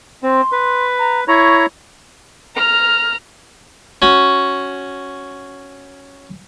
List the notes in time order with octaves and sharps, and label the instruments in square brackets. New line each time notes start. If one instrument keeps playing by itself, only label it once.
[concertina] C4 [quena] C6
[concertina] B4
[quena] A#5
[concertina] E4 C#5 A#5 [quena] C#6
[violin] A#5 F6
[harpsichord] C#4 F#4